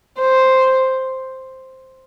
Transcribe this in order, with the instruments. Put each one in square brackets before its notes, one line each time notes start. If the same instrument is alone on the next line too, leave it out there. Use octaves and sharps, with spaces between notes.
[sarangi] C5